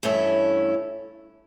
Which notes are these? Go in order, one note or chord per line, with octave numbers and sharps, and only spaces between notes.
G2 E3 A3 C#4 E4